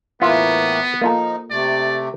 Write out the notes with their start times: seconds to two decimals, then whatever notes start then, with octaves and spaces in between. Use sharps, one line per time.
0.22 A2 E3 A#3 B3 F4 E5 F5
1.01 F3 A#3 D#4 F4 A4
1.51 C3 A3 D5